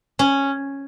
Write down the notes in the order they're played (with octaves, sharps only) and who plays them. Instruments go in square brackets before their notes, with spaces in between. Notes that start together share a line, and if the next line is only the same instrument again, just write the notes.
[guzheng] C#4